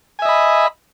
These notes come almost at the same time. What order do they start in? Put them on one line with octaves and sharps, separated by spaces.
G#5 E5 D#5 B5